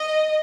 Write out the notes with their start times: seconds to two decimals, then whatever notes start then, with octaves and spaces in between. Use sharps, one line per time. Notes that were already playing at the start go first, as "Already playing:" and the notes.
Already playing: D#5